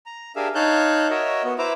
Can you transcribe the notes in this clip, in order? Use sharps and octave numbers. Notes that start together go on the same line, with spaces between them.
A#5
D4 G4 G#4 A#4 E5 F5
D#4 C#5 F5 A5 F#6 G6
F#4 A#4 C#5 D#5 E5
B3 F#4
E4 B4 C5 E5 A#5 D6